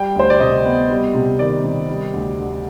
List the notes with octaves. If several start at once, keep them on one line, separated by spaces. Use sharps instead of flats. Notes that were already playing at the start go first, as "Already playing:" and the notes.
Already playing: G3 G5
D2 C5
D5
C3 D#5
B3
G3
C3
D#3 D5
C3
G3
D2
D3